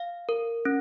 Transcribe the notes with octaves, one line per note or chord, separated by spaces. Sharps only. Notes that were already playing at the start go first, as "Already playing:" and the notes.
Already playing: F5
A#4
C#4